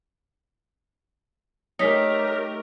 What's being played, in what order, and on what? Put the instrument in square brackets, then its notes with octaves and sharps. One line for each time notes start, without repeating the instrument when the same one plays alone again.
[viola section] A3 G4 A#4 [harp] D#4 [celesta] C#5 B6